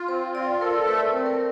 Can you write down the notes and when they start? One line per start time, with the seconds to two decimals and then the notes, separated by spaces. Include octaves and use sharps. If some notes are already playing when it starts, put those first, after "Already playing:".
Already playing: F4
0.08 C4 C5
0.35 F4 D5
0.61 A4 A#4
0.87 A3 B4
1.13 C4
1.26 A#4